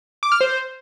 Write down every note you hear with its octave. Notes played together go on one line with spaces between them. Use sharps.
D6
F6
C5